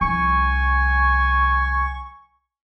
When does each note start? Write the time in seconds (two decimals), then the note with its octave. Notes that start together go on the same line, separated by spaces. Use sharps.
0.01 C2 F3 G#5 C#6